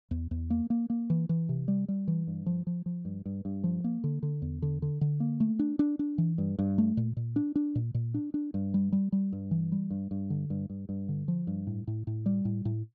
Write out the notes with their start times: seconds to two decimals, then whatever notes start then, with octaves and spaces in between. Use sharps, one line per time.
0.11 E2
0.31 E2
0.50 A#3
0.70 A#3
0.90 A#3
1.10 E3
1.29 E3
1.49 C3
1.68 G3
1.88 G3
2.08 E3
2.27 G2
2.46 F3
2.67 F3
2.86 F3
3.05 G2
3.26 G2
3.45 G2
3.64 F3
3.84 A#3
4.04 D3
4.23 D3
4.42 E2
4.62 D3
4.82 D3
5.01 D3
5.20 A#3
5.40 A3
5.59 D4
5.79 D4
5.99 D4
6.18 E3
6.38 G2
6.59 G2
6.78 A3
6.97 A#2
7.17 A#2
7.36 D4
7.56 D4
7.75 A#2
7.94 A#2
8.14 D4
8.34 D4
8.54 G2
8.74 G3
8.92 G3
9.12 G3
9.33 G2
9.51 E3
9.72 G3
9.90 G2
10.11 G2
10.30 D3
10.50 G2
10.70 G2
10.89 G2
11.09 D3
11.28 F3
11.47 G2
11.67 A2
11.87 A2
12.07 A2
12.26 G3
12.45 A2
12.65 A2